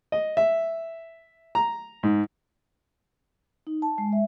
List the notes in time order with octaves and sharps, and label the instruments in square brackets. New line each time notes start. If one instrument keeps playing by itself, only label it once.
[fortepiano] D#5
E5
A#5
G#2
[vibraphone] D#4
A5
G#3
E5